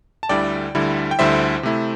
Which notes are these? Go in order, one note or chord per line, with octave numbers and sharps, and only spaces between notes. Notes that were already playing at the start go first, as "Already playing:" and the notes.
A5
D2 D3 G3 E4 D5 G5
D2 D3 G3 E4
G5
D2 D3 G3 E4 C5 E5
C3 A3 E4